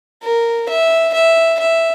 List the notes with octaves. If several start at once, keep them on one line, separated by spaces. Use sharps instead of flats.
A#4
E5
E5
E5